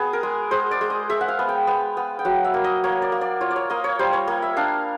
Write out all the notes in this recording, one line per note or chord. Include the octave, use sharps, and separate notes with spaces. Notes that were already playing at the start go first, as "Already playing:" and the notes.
Already playing: B3 G#4
A#4
G#3
G#3 C5
D5
G#3
D#5
G#3 E5
F#5
F5
B3
G5
B3
B3
G5
F#3 F#5
E5
A#3
D#5
A#3 C#5
D5
A#3
D5
F4 C#5
D5
C#5
A#3 D#5
C#5
G3 C5
C#5
A#3
E5
D4 F5